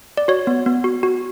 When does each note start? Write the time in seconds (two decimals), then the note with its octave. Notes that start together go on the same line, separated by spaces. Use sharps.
0.17 D5
0.28 F#4 C#5
0.47 B3
0.66 B3
0.84 F#4
1.03 F#4